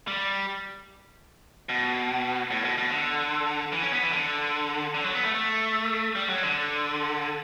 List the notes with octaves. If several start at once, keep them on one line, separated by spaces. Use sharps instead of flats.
G3
B2
A2
B2
B2
D3
E3
C#4
B3
E3
D3
D3
F#3
B3
A3
A3
G3
F#3
D3